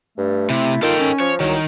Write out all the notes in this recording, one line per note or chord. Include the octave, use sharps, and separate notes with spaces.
G2 A3
C3 E4
D#3 F4 A4 G5
C#4
F3 C#5
C2 D#3 F#3